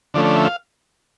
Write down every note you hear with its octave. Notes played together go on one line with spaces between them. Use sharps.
D3 F3 A3 C#4 D5
D5
E5
F5